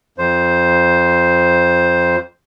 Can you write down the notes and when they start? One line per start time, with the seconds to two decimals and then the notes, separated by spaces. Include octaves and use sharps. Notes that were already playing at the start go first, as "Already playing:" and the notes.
0.18 F2 C5